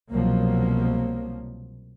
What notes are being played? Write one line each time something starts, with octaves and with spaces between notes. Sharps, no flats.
C2 B2 F3 F#3 A#3